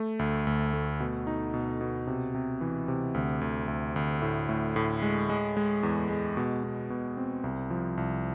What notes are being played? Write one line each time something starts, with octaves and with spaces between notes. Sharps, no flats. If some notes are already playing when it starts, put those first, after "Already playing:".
Already playing: A3
D2
D2
A3
B2
D#4
B2
B2
C3
C3
E3
C3
D2
D2
D2
D2
A2
A2
A2
G#3
G#3
G#3
E2
G#3
B2
B2
B2
C4
C2
F3
C2